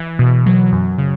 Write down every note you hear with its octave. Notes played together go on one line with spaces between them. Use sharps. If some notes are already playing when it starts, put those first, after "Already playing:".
Already playing: E3
B2
F#3
F#2
C#3